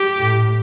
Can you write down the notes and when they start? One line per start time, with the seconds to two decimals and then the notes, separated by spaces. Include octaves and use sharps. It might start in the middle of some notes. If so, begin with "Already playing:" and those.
Already playing: G4
0.17 A2